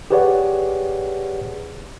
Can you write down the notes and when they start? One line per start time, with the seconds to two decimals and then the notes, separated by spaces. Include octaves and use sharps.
0.11 G4 G#4 B4 C#5 D5 F#5